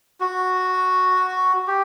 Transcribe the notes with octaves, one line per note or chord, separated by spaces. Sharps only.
F#4
G4